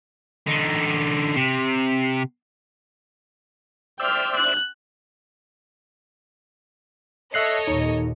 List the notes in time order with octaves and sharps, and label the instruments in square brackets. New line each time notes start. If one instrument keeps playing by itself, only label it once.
[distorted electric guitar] D3 D#4
C3
[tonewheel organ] C5 D5 E5 [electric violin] G5 F6
[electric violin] F#6
[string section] A4 C#5 D#5 [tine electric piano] E5 F#6 C7
[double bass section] D#2 A#2 [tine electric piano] D#4